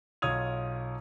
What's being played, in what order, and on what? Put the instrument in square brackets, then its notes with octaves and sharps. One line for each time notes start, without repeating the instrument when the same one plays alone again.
[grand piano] B1 F4 C#5 D#6 G#6 F7